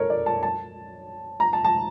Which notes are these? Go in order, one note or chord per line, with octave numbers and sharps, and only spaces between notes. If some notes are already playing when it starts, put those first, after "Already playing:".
Already playing: A4 A#4 C#5
D5
A5
A5
A#5
A5
A5